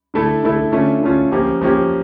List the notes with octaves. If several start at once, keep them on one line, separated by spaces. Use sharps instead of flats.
D3 A3 E4 A4
D3 A3 E4 A4
D3 A3 C#4 F4
D3 A3 C#4 F4
F3 A#3 C#4 G4
F3 A#3 C#4 G4